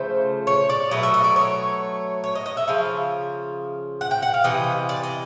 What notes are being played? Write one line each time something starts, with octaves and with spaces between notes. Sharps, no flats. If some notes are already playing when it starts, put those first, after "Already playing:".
Already playing: C#3 F3 A3 C5
C#5
D5
B2 F#3 A3 D#5
E5
D#5
D5
C#5
C#5
D#5
D#5
E5
C#3 F3 F5
F#5
G5
F#5
F5
C3 E3 D#5
D5
D#5